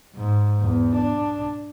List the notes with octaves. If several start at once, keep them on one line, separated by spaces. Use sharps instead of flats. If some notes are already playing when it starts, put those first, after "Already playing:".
G#2
E2
D4